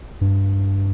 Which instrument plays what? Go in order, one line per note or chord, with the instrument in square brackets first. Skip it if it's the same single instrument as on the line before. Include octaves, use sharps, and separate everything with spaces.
[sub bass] G2